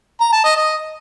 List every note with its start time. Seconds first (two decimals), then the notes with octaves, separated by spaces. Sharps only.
0.21 A#5
0.32 A5
0.44 D#5
0.56 D#5